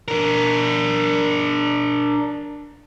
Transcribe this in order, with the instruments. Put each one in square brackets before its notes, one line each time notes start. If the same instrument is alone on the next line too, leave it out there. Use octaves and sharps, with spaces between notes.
[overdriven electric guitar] D4 A#4